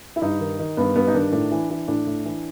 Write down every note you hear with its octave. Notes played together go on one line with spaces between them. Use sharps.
E4
G2 D#4
D#3
D#3
G2 B3
G2 B3
D#4
D#3 D4
A2 D4
E3
E3
A2 D4
A2
E3